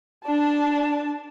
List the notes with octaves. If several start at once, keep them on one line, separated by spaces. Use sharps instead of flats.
D4 A5